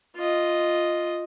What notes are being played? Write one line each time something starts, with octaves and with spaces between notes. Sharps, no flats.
F4 D#5